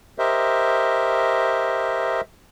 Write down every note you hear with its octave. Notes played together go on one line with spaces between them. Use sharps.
G4 A#4 C5 D#5 E5